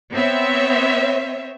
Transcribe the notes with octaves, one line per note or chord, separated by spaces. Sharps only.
B3 C4 C#5 E5